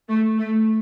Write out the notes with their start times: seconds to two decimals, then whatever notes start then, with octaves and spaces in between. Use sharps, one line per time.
0.09 A3
0.39 A3